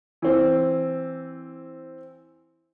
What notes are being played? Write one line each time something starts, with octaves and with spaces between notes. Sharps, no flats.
E3 C4